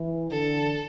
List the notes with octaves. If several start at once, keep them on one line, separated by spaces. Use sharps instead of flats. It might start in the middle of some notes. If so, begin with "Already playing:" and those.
Already playing: E3
D3 A4